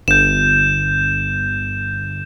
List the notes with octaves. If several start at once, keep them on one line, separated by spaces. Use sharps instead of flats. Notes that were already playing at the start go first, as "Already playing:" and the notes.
G1 G6 E7